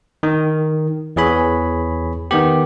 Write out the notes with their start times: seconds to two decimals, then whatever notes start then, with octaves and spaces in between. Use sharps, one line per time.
0.23 D#3
1.16 E2 E3 G#4 C#5 B5
2.31 D#3 B3 G4